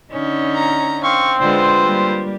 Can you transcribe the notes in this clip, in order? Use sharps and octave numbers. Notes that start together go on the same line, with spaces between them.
D3 C#4 D#4
A#5
C4 F5 C#6
D3 G#3 F4 B4 C5
G3 A#3